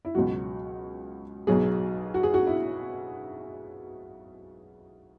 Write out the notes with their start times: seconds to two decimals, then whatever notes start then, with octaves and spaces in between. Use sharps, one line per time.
0.05 E4
0.15 C#2 B2 F#3 F#4
1.47 B1 B2 F#3 G#4
2.14 F#4
2.23 G#4
2.34 F#4
2.47 E4